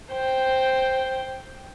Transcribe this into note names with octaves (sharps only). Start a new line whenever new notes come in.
C5 G5